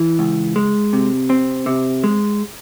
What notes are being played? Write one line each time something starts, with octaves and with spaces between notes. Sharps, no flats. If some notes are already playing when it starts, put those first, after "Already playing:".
Already playing: E3
C#2
G#3
C3
C4
C3
G#3